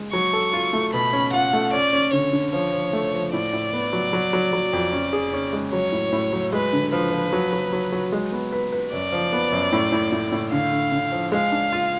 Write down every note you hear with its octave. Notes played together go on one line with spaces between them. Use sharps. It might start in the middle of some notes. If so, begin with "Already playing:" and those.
Already playing: G#3
F#3 C#6
A4
F4
A3
B2 B5
C#4
F4 F#5
A3
C#4 D5
C#4
D3 C#5
D3
F3 C#5
F3
A3
F3
A2 D5
A2
B3
F#3
F#3
F#3
F#3
F2
C#4
G#4
C#4
G#3
F#3 C#5
A2
A2
F#3
G#3 B4
D3
F3 B4
F3
F#3
F#3
F#3
F#3
G#3
B3
B4
B4
F#2 D5
F3
B3
F#2
A2
A2
A2
A2
D3 F5
D3
D3
F3
G#3 F5
D4
F4